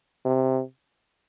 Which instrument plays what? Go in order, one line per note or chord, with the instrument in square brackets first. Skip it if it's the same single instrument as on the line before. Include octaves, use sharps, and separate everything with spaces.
[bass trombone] C3